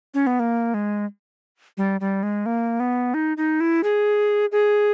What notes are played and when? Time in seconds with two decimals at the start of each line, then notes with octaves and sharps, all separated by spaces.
0.14 C#4
0.27 B3
0.40 A#3
0.74 G#3
1.78 G3
2.01 G3
2.23 G#3
2.46 A#3
2.80 B3
3.14 D#4
3.37 D#4
3.60 E4
3.84 G#4
4.52 G#4